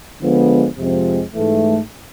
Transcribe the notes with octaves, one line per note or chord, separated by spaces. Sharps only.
D3 F3 G#3 B3
F2 C3 F3 G#3 C4
G#2 E3 A3